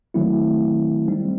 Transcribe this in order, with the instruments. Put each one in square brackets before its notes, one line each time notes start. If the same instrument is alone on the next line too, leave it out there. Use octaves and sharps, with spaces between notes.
[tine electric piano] D#3 F#3 A3 C4 E4
G3 C4 D#4